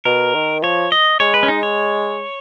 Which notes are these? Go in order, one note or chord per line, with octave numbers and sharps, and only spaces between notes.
B2 A#4
D#3
F3 C#5
D#5
G#3 C#5
B4
C#4
D#4
C#5